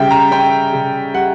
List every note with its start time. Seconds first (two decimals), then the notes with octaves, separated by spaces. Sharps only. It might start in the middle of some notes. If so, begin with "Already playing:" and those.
Already playing: C#3 G3 E5 G5
0.11 A#5
0.31 C#4 G5
0.73 C#3
1.14 G3 F#5